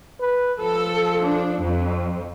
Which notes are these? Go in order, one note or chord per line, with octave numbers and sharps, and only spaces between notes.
B4
F3 A4
D4
F2